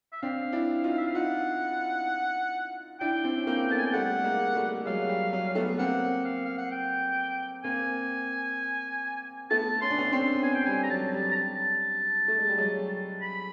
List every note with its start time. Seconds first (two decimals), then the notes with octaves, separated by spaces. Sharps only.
0.12 E5
0.22 C4 D4 F5
0.53 D4 E4
0.84 D#4 F4
0.98 E5
1.07 F5
1.15 D#4 F4 F#5
3.01 D4 E4 G5
3.24 C4 D4
3.37 C#4
3.47 A#3 C4
3.70 A3 B3 A5
3.78 G#5
3.86 G5
3.93 G3 A3 F#5
4.24 G#3 A#3
4.55 G3 A3
4.86 F#3 G#3 F5
5.09 G3
5.33 F#3
5.55 A3 B3
5.79 A#3 C4 F#5
6.25 F5
6.45 F5
6.58 F#5
6.72 G5
7.64 A#3 C4 G#5
9.50 A3 B3 A5
9.81 C#4 C6
9.90 D4
9.98 B3 C#4
10.12 C4 D4 C6
10.43 B3 C#4 G#5
10.55 G5
10.66 G3 G#5
10.83 A#5
10.90 F#3 A5
11.13 G3
11.31 A#5
11.35 A5
11.82 A5
12.28 A3
12.39 G#3
12.48 G3
12.58 F#3 G#3
13.22 B5